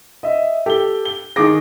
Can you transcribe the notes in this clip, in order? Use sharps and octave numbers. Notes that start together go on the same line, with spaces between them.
D#5 E5
G4 A4 G7
G7
D#3 G#4 D6 A#6